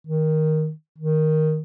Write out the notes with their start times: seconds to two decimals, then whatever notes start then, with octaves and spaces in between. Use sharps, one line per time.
0.07 D#3
0.98 D#3